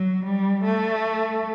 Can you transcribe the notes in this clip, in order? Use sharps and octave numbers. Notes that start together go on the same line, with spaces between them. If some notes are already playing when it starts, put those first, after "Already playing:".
Already playing: F#3
G3
A3